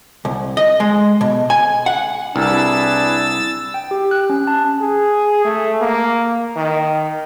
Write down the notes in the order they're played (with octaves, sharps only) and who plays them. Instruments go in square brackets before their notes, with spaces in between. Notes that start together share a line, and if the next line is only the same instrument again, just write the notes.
[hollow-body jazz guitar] C2
D#5
G#3
B2
G#5
F#5
[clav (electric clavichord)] C2 [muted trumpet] D4 [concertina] E4 G#4 B4 [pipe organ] E6 A6
[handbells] G5
G4
F#6
C#4
A5
[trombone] G#4
A3
A#3
D#3